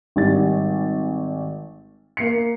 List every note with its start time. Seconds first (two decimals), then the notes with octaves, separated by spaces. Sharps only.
0.16 G#1 G3 A6
2.17 A#3 C7 C#7